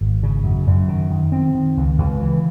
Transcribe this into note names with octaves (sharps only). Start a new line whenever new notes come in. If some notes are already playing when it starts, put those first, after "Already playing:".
G#1
C#3
F#2
F#2
D#3
D#3
C4
D#3
C#2
C#2
E3